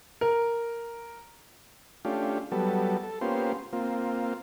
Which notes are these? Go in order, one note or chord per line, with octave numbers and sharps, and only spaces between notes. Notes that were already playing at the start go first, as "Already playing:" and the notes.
A#4
A3 C#4 D4 F4 G4
F#3 G3 B3 A4
A4
A#3 B3 C#4 F4 G4 C5
A#3 C4 F4